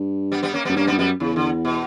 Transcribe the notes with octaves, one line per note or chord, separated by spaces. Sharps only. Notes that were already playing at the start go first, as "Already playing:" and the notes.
Already playing: G2
G3 B3
G3 B3
A#3 C#4
F#2 G3 B3
G2 A#3 C#4
G3 B3
G2
F#2 G3 B3
E2 C#3
D3
B2